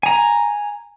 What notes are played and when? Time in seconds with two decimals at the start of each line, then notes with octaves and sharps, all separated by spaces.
0.03 G#5 A#5